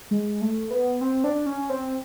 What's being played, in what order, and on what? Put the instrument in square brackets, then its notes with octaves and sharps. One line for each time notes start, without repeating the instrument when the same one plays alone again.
[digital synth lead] G#3
A3
B3
C4
D4
C#4
C4